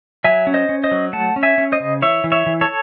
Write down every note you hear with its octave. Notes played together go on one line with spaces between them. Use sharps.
F#3 E5 G#5
C#4
C5 D#5
C#4
C5 D#5
F#3
A3 F#5 A5
C#4
E5 G#5
C#4
C5 D#5
C#3
E3 C#5 E5
E3
C#5 E5
E3
A4 C#5